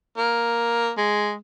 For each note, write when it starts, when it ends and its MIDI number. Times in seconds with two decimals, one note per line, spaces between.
0.18 0.91 58
0.98 1.35 56